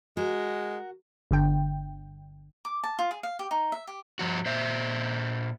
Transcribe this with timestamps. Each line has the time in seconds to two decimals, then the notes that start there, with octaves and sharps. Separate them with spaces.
0.17 G#3 F#4 A#4
1.31 G1 D3 G5
2.65 D6
2.84 A5
2.99 F4
3.11 G#4
3.23 F5
3.39 G4
3.51 D#4
3.72 E5
3.87 G4
4.19 G2 F3 F#4
4.46 A#2 C5 E5